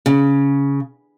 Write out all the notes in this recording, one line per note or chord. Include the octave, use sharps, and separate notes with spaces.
C#3